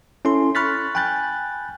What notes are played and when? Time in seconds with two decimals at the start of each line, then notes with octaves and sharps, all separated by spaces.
0.25 C#4 E4 A4 C6
0.55 B5 C#6 F6 F#6 A6 B6
0.95 G5 G#5 B5 F#6 G6 A6